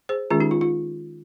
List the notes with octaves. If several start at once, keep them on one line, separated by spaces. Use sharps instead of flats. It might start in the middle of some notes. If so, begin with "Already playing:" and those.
G#4 C5
D#3 G#3 C#4 F4 G#4
D#4 G4
F4
F4